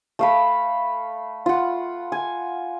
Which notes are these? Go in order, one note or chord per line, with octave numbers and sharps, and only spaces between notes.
A3 F5 B5
F4 F#5
G#5